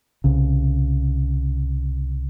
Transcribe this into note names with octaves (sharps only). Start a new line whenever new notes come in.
C2 C#3